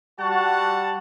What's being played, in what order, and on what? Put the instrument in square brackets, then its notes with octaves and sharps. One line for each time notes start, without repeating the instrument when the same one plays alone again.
[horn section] G3 F#5 A5 [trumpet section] F#4